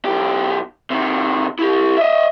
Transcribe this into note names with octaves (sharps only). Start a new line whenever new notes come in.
B1 G4
C3 D#3
E4 G4
D#5 E5